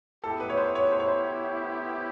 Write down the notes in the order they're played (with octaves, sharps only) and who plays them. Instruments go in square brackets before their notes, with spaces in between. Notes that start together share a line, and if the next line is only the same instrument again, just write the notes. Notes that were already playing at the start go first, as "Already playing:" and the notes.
[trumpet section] B3 E4 G4 [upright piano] A4
[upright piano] B4
C#5
C5
C#5
C5
C#5
C5